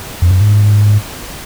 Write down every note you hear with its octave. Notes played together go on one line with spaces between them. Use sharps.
F2
F#2
G#2